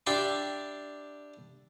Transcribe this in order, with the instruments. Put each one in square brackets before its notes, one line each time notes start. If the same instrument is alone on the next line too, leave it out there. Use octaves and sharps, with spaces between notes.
[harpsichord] D4 G4 E5 A5 B5 C6